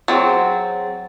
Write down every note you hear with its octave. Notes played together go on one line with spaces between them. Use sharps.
F#3 C4 G#4 C5 A6